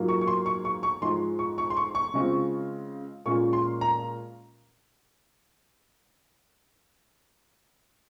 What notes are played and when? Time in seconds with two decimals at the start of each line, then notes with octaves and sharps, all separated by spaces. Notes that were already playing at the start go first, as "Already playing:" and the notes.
Already playing: G#2 F#3 A#3 F4
0.08 C#6
0.21 C#6
0.27 C6
0.46 C#6
0.65 C#6
0.83 C#6
1.02 G#2 F3 G#3 C6
1.39 C#6
1.58 C#6
1.70 C6
1.77 C#6
1.95 C#6
2.14 C#3 G#3 C4 F4
3.26 A#2 G#3 C#4 F4 C#6
3.53 C6
3.81 A#5